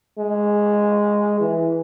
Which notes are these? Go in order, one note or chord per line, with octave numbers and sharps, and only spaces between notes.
G#3
E3